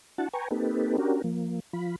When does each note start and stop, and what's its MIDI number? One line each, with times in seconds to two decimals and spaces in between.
0.18 0.28 62
0.18 0.28 64
0.18 0.28 66
0.18 0.28 78
0.18 0.28 81
0.33 0.48 71
0.33 0.48 79
0.33 0.48 80
0.33 0.48 82
0.33 0.48 85
0.51 0.97 58
0.51 0.97 60
0.51 0.97 63
0.51 0.97 67
0.51 0.97 69
0.51 0.97 71
0.98 1.22 61
0.98 1.22 62
0.98 1.22 66
0.98 1.22 67
0.98 1.22 70
1.24 1.60 53
1.24 1.60 58
1.73 1.96 53
1.73 1.96 65
1.73 1.96 83